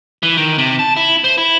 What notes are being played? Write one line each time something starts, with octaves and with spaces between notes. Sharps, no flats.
E3
D#3
C3
A5
E4
C5
E4